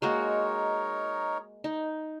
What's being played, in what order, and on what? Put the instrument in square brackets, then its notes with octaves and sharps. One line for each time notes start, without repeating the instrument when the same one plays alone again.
[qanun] G#3 A#3 F#4 [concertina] D#4 A#4 C#5
[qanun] D#4